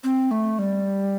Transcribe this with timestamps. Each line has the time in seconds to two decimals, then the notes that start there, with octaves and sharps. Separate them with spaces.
0.04 C4
0.31 A3
0.59 G3